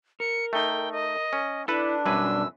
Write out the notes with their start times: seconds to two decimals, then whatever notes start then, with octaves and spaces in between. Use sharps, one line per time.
0.20 A#4 C#7
0.53 A3 D#4 G5
0.92 D#5
1.33 C#4
1.68 D4 E4 A4 B4
2.06 F#2 B2 G3 B4 G#5 E6